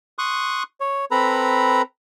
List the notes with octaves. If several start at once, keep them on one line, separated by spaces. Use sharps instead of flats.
C6 C#6 D#6 F#6
C#5
C4 A4 B4 A#5 B5